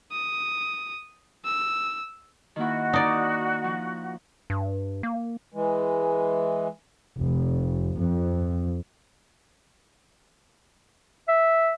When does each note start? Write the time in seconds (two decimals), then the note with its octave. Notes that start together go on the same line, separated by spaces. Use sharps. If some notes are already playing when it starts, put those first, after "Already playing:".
0.12 D#6
1.45 E6
2.56 D#3 A#3 E4 F#4
2.93 D#4 D5
3.64 F3
4.50 G2
5.03 A#3
5.54 E3 G#3
7.19 F1
7.96 F2
11.29 E5